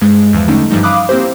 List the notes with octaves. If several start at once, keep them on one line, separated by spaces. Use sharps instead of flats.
G2 G#3
E2 E3 F3
D3 G3 A3 C#4 D#4
G2 E3 F3 G3 D#4
F5 B5 D6 D#6 F#6
A#3 C4 E4 G4 C5